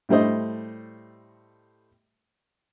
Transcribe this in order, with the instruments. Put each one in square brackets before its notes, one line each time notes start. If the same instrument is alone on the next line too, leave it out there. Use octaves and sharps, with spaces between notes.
[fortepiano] A2 G3 A3 C5 D#5